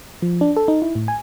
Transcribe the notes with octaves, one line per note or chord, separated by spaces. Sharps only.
F3
D4
A4
D#4
E4
A2
G#5